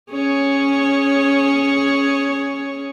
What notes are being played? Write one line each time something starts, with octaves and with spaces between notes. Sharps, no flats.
C#4 G#4 C#5